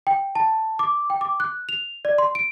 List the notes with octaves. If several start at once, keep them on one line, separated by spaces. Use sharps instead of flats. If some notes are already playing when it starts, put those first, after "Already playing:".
G5
A5
D6
G5
D6
F#6
F7
D5
C6
D7